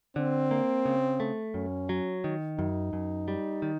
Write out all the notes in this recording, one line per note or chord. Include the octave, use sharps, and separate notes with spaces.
D3 C4
A#3
C#3
A3
F#2 C#4
F#3
D#3
F#2 D#4
F#2
G3
D#3